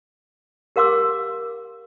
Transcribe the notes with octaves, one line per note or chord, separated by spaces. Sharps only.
G4 A#4 F5 C6 D6 E6